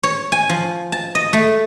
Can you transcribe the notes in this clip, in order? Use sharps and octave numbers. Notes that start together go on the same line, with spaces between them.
C#5
G#5
F3
A5
D#5
A3